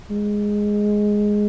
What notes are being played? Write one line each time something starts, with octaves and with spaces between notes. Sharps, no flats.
G#3